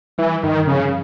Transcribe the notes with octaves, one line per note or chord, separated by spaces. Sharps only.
E3 G3
G2 D#3
C#3 F3